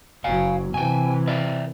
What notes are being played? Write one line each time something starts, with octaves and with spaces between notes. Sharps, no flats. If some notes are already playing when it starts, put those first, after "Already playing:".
F#1 F#3 F5 G#5
C3 E3 G5 G#5
A#4 D5 E5